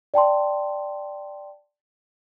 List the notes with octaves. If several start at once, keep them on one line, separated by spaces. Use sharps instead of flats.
D5 G5 A5 C6